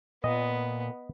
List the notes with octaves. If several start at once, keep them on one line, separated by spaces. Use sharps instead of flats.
A#2 B3 D#5